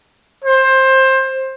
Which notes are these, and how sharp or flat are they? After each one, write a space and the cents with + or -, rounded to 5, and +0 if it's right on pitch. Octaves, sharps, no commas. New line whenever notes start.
C5 +20